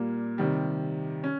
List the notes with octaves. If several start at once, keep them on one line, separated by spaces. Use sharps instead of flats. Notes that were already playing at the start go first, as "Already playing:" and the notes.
Already playing: A#2 G3 A#3
C3 D#3 G3
C#4